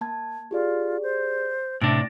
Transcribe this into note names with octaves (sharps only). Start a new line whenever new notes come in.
A#3 A5 G#6
F4 G4 G#4 D5
C5
A2 C3 D4 A6 A#6 D7